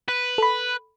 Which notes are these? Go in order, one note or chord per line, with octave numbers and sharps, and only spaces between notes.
B4
A4 B5